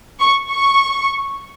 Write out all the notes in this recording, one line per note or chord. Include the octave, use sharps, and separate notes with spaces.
C#6
C#6